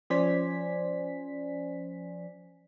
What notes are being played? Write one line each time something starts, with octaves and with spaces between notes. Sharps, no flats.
F3 C#4 C5 D5 G#5 B6